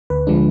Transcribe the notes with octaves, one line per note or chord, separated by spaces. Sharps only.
D2 B4
D3 F3 G#3 D4